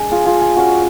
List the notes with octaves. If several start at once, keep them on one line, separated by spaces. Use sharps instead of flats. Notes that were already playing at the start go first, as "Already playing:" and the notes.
Already playing: G#3 D4
F4 G#4
F4 G#4
F4 G#4
G#3 C#4 F4 F#4